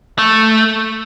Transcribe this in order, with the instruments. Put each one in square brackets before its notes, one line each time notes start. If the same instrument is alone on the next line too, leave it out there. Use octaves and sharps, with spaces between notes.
[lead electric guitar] A3